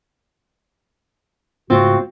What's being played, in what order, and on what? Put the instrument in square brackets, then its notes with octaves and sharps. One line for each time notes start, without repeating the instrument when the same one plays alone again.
[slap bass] G#2 C#3 A3 [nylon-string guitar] C4 F4 [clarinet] F#4